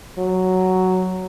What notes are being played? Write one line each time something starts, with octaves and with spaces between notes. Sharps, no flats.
F#3